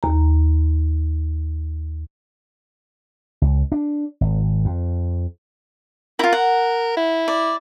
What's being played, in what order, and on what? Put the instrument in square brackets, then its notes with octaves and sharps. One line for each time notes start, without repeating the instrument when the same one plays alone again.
[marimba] D#2 A#5
[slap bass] C#2
D4
G#1
F2
[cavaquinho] E4 F4 [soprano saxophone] A#4
[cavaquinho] F#5
[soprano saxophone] E4
[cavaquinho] D5